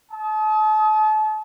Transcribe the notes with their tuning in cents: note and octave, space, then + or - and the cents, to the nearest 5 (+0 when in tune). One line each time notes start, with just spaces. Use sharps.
A5 -35 D#6 +25